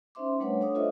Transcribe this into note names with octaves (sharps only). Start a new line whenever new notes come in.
C#4 D#4 C5 E5 C6 D6
G3 A3 D4 B4 C#5 F#5
D4 A4 C#5 F5 D6 D#6
F4 A4 C5 D#5 E5